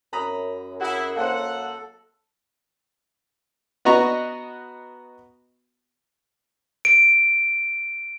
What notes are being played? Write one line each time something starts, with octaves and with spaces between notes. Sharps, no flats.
F#2 A#5 B5 D#6
E4 F#4 G#4 F#5
A#3 A4 C5 F#5
B3 F#4 D#5 A#5 C#6
D7